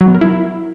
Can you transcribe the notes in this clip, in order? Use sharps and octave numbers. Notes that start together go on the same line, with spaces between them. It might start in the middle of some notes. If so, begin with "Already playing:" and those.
F#3
B3
A#4
E4